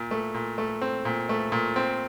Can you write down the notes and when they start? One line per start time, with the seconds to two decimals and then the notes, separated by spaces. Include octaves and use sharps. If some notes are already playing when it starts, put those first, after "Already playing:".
Already playing: A#2
0.11 A3
0.34 A#2
0.58 A3
0.82 C4
1.05 A#2
1.29 A3
1.52 A#2
1.76 C4